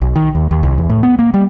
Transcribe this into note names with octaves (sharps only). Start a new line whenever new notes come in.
B1
D#3
D#2
D#2
C2
E2
A2
B3
A#3
G3